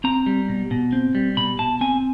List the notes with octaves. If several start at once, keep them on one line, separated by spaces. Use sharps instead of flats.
C4 A#5
G3
B2
B2
C4
G3
B2 B5
B2 A5
C4 G#5